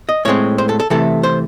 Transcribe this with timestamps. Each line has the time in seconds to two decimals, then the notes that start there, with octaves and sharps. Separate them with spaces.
0.09 D#5
0.25 A2 G#3 C4 C#5
0.58 C5
0.69 A4
0.80 A4
0.90 C3 E3 A3 A4
1.23 C5